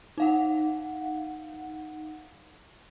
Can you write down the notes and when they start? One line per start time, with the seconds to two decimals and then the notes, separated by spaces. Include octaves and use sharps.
0.18 D#4 F5 F#5